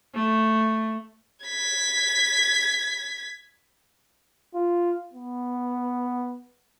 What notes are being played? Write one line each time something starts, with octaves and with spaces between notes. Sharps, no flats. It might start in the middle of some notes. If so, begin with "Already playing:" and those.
A3
G#6 B6
F4
B3